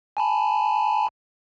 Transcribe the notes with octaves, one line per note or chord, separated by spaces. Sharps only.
G#5 A5 B5